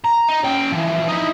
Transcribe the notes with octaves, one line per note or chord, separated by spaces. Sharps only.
A#5
D#4
C#4 G5
E3 F3
D#4 E4